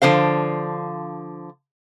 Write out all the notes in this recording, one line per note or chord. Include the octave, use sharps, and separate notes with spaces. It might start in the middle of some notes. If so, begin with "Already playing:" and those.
D3 F3 C5 F5